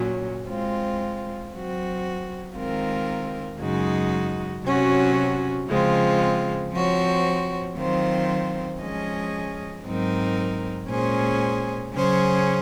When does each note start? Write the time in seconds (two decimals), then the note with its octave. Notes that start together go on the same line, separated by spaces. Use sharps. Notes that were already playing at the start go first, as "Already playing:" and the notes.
Already playing: A#2 F#3 C#4
0.48 G#3 C4 F4
1.52 F#3 C4 F#4
2.56 D#3 G#3 C4 F4 A#4
3.60 F#2 C#3 G#3 D#4 F#4
4.64 C3 F#3 C#4 F#4
5.68 C#3 F3 G#3 C4 F4
6.72 F3 C4 F#4 C#5
7.77 D#3 F#3 C4 F4 C5
8.81 F3 G#3 C#4 G#4 D#5
9.85 G#2 F#3 C4 D#4 A#4
10.89 A#2 G#3 C#4 G#4 C5
11.93 C#3 F#3 C#4 G#4 C5